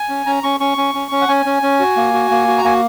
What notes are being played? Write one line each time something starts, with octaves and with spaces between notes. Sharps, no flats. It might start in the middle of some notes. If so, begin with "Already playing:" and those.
Already playing: G#5
C#4
C#4 A#5
C#4 C#6
C#4 C#6
C#4
C#4
C#4
F#5
C#4 G#5
C#4
C#4
F#4
A#3
F#4
A#3
F#4
A#5
A#3 G#5